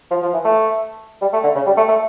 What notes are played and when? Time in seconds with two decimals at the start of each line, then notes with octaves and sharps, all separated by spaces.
0.11 F3
0.22 F3
0.34 E3
0.44 A3
1.21 G3
1.33 A3
1.44 D3
1.55 C#3
1.66 G3
1.77 A3
1.89 A3